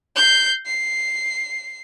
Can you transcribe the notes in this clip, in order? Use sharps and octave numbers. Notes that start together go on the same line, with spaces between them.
G6 C7
C7